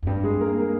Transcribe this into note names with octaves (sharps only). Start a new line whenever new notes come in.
F2
G2 G3 G4
G#3 G#4
A#3 A#4
A#3 A#4